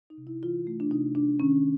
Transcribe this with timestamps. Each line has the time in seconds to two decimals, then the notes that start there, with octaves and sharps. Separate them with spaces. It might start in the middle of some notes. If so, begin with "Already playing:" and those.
0.10 D#4
0.17 C3
0.27 E4
0.43 E3 F4
0.67 A3
0.80 D4
0.91 C3 D#4
1.15 C3 D4
1.40 D#3 C#4